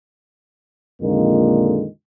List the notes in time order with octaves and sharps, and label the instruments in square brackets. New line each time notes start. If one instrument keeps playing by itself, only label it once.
[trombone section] F2 A#2 D3 D#3 G#3 A#3